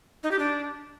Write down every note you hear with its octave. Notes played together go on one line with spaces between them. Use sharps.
D#4
G4
D4